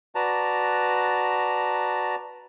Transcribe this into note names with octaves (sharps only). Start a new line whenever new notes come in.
F#4 B4 D5 A5 A#5